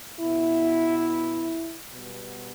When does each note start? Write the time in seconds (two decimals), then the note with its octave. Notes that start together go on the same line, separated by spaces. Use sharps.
0.20 B2 B3 E4
1.94 B2 G3 B3